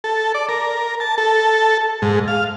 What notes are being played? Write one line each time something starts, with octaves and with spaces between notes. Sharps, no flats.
A4
D5
A#4
A5
A4
G#2
F5